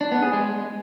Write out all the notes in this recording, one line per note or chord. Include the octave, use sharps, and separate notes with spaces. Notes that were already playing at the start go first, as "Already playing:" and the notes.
D4
B3
G#4
G#3